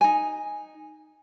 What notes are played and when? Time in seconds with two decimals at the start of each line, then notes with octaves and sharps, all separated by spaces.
0.01 D#4 G#5